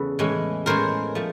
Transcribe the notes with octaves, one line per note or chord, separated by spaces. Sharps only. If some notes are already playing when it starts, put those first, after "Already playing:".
Already playing: E2 C#3 A4 B4
A2 E3 G#3 C#4
A2 E3 G#3 C#4 A#4 C5
F3 A3